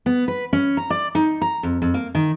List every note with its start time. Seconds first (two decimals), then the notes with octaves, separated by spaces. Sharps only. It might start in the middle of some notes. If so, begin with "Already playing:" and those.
0.06 B3
0.28 B4
0.53 C#4
0.77 A#5
0.90 D5
1.15 D#4
1.41 A#5
1.63 F2
1.82 F2
1.94 A#3
2.15 D#3